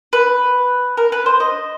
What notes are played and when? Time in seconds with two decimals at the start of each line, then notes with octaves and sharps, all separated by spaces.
0.13 B4
0.97 A#4
1.12 B4
1.26 C5
1.40 D#5